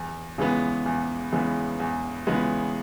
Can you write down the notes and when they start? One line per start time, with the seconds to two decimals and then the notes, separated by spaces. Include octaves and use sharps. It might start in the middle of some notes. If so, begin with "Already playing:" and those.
Already playing: E2
0.38 C#3 E3 G#3 B3
0.86 E2
1.32 C#3 E3 G#3 B3
1.80 E2
2.27 C#3 E3 G#3 B3